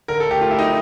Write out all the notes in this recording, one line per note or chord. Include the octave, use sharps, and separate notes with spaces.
D3 A#4
A4
A3
G4
A3 F4
E4
F#3 D#4